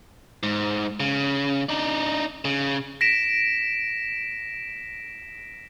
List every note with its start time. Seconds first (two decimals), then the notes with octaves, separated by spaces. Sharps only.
0.43 G#2
1.00 C#3
1.69 D4 D#4
2.45 C#3
3.01 A#6 B6 D7 E7